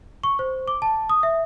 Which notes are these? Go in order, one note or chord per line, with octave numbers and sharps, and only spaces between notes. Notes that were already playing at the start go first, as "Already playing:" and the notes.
C#6
C5
D6
A5
D#6
E5